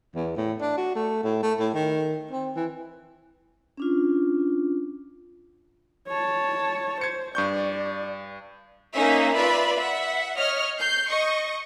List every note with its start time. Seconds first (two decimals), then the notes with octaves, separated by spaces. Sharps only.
0.15 E2
0.37 A2
0.61 D4
0.78 F#4
0.95 A3
1.23 A2
1.43 A3
1.60 A2
1.74 D#3
2.31 C4
2.56 E3
3.77 C#4 D4 F4
6.08 C#5 A5
7.01 C5 G#6 C#7
7.35 G2 D5 C#6 G6
8.93 A#3 C#4 D#4 E5 G#5
9.35 F4 B4 D5 E5 B5
9.78 E5 F#5
10.37 C#5 D#5 F6
10.79 G6 C7
11.09 D#5 C#6